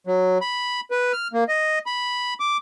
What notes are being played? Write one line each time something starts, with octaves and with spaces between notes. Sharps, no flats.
F#3
B5
B4
F6
A#3
D#5
B5
D6